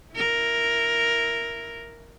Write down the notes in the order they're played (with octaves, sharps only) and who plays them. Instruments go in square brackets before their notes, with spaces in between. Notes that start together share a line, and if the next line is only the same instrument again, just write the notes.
[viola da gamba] E4 A#4